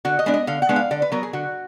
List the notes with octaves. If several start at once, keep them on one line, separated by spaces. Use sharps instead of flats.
D3 F#4
D#5
G#3 B3 D4
D#5
D3 F5
F#5
G#3 B3 D4
F5
D3 D5
B4
F#3 B3 A#4
G#4
D3 F#4